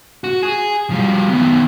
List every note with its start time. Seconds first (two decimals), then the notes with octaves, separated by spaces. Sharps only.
0.24 F#4
0.43 G#4
0.90 F3 G3
1.29 D#3 B3